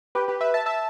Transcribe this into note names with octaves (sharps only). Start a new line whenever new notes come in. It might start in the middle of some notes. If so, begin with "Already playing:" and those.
G4 B4
G4 B4
B4 E5
E5 A5
E5 A5